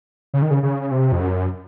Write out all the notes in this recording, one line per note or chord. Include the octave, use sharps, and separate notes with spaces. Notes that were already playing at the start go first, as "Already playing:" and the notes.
C#3
D#3
C#3
C#3
C3
F2
F#2